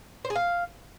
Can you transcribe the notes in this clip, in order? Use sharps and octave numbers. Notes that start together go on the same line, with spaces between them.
C5
G#4
F5